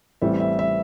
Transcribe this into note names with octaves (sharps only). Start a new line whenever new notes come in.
A1 A2 E3 G3 C4 E5
E5
E5